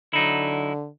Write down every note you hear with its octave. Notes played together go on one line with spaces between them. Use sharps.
D3 F#3 D#4 E4